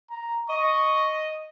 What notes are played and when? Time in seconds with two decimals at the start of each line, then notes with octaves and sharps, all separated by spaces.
0.10 A#5
0.50 D#5 C#6